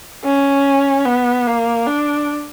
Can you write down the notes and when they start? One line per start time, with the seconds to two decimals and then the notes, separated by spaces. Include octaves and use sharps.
0.24 C#4
1.06 B3
1.47 A#3
1.87 D4